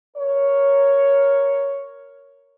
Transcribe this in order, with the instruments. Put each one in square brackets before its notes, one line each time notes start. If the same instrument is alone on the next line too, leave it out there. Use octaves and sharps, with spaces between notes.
[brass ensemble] A#4 C#5